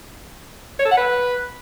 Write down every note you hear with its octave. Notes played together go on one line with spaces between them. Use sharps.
C#5
A4
F#5
B4